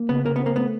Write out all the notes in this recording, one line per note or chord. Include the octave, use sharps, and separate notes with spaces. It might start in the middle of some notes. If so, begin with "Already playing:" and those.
Already playing: A#3
C#3 B3
C#3 A#3
B3 C4
A#3
A3 B3